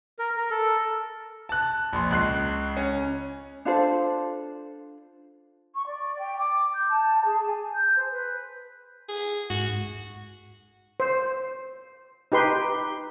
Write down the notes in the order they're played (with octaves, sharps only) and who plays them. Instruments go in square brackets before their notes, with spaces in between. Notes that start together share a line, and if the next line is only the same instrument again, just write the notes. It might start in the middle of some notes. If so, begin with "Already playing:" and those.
[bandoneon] A#4
A#4
A4
[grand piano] A5 F#6
A#1 C6
C#2 F#6 C7
C#4
[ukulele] D4 F4 A4 C5
[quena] C#6
D5
G5
D6
G6
A5
G#4
G#5
G6
C5
B4
[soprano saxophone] G#4
[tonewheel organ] G#2 [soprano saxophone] F#4
[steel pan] C5
D#4 G4 B4 C6